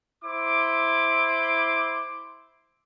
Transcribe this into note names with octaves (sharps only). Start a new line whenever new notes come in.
E4 C5 D6